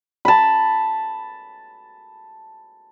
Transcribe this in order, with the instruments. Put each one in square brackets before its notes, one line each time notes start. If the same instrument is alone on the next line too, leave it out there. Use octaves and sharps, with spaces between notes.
[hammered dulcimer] A5 B5